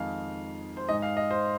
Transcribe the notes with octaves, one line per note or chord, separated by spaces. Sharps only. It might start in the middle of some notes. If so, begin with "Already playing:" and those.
Already playing: F2 D#3 G#3 D#4 F5
C5
G#2 G#3 D#4 D#5
F5
D#5
C5